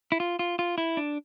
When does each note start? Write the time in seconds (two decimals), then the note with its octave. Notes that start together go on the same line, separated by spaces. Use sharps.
0.12 E4
0.20 F4
0.39 F4
0.59 F4
0.78 E4
0.97 D4